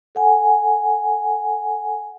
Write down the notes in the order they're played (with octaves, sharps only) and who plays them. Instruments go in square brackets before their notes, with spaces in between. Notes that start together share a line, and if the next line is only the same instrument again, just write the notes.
[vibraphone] A4 F#5 G#5